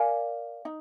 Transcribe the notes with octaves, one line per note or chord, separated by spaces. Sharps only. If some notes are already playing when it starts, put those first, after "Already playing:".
Already playing: A#4 D5 F5 G#5
D#4